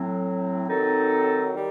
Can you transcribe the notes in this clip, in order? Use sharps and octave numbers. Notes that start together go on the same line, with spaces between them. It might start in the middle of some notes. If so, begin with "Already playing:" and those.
Already playing: A2 F#3 C4
D#3 F#3 C4 D#4 A4
D#3 G3